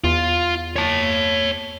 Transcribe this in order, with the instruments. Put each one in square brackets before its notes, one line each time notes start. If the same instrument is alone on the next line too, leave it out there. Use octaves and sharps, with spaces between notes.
[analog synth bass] E2 [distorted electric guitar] F4
[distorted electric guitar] C#5 A5